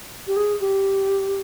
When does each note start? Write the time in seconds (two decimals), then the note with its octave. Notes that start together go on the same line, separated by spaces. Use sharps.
0.27 G4
0.36 G#4
0.60 G4